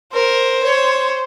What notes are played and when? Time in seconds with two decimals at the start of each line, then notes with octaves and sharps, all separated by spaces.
0.13 A#4 C5
0.64 C#5